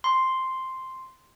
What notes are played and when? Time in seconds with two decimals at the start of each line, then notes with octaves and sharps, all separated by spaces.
0.04 C6